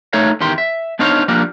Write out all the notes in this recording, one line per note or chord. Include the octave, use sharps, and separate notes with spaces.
A3 D#4 A4 C#5 F5
E2 D#3 G4 C6
E5
B3 D4 D#4 C5 C#5 F5
F3 G3 A#3 D4